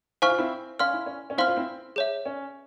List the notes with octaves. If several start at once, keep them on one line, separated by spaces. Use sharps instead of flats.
E4 C5 F5 G#5 C#6 F6
F4
C4 E4
C#4 F5 C6 F6
E4
C#4
C#4
C4 E4 C5 F5 C6 F6
C#4 F4
C4 E4
G#4 C#5 E5
C#4